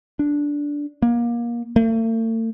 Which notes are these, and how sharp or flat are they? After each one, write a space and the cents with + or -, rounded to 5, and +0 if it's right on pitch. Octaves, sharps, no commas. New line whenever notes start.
D4 -10
A#3 +25
A3 +45